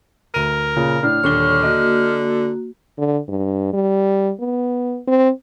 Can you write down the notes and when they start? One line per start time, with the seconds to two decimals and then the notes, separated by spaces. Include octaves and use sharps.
0.34 D2 A#4 D#7
0.76 A#2 C#3
1.03 A2 D4 F6
1.24 D#1 D3 D4 C#5 C#6 G7
1.63 A#3 F#4 D#5
2.98 D3
3.29 G2
3.73 G3
4.40 B3
5.08 C4